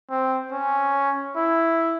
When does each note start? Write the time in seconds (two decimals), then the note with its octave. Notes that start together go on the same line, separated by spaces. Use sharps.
0.10 C4
0.52 C#4
1.37 E4